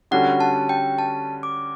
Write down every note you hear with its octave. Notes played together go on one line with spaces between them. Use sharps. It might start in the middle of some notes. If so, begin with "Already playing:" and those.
D3 G3 C#4 F#4 A4 F#5
A5
G5
A5
D6